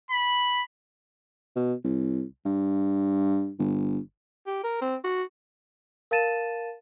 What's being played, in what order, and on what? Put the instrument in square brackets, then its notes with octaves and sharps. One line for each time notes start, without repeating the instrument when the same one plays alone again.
[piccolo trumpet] B5
[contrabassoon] B2
C2
G2
G1
[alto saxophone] G4
A#4
C4
F#4
[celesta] A#4 F5 A5 A6 D#7 E7